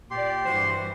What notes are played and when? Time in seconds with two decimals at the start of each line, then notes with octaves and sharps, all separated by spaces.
0.11 A#2 G4 D5 C6
0.45 G2 E3 F#4 C5